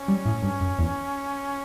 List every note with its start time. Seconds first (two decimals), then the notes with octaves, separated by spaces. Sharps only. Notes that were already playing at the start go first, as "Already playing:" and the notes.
Already playing: C#4
0.08 G3
0.25 A2
0.42 G2
0.61 F#2
0.78 E2